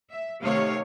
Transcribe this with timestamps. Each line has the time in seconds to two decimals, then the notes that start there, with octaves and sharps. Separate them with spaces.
0.10 E5
0.42 C3 D#3 A3 C#5 F5